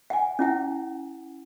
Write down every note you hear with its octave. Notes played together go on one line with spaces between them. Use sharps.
F#5 G#5
C#4 E4 F#5